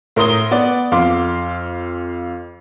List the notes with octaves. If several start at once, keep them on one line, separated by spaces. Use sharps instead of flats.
A2 A#4 C6 D#6 G7
B3 D5
F2 F5 C6 D6